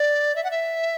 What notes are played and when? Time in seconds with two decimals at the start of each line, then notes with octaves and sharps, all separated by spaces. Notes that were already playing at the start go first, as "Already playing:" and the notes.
Already playing: D5
0.36 E5
0.44 F#5
0.51 E5